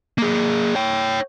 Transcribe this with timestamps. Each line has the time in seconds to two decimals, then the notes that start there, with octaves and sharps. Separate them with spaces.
0.18 A#3 G#4
0.75 C#5 G5